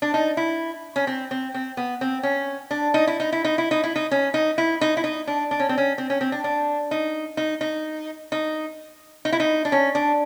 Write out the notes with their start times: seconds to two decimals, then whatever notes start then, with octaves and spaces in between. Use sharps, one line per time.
0.02 D4
0.14 D#4
0.37 E4
0.96 C#4
1.07 C4
1.31 C4
1.54 C4
1.77 B3
2.01 C4
2.23 C#4
2.71 D4
2.94 D#4
3.07 E4
3.20 D#4
3.32 E4
3.44 D#4
3.58 E4
3.71 D#4
3.83 E4
3.96 D#4
4.11 C#4
4.34 D#4
4.58 E4
4.81 D#4
4.97 E4
5.04 D#4
5.27 D4
5.51 D4
5.60 C#4
5.69 C4
5.78 C#4
5.98 C4
6.10 C#4
6.21 C4
6.32 D4
6.44 D4
6.91 D#4
7.37 D#4
7.61 D#4
8.32 D#4
9.25 D#4
9.32 E4
9.40 D#4
9.65 D4
9.72 C#4
9.95 D4